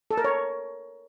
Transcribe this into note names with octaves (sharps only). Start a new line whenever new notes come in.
A4
A#4
C#5